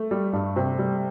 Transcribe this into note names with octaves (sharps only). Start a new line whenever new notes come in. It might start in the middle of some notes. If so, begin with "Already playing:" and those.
Already playing: A3
G3
G2
C3
G3